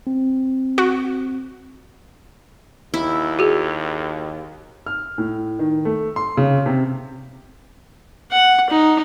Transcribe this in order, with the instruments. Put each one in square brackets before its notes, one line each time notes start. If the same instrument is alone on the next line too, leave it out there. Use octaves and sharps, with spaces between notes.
[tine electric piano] C4
[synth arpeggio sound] F#4
[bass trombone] D#2 [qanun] E4
[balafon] F#4 G#4
[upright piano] F6
A2
D#3
A3
C6
C#3
C3
[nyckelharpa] F#5
D#4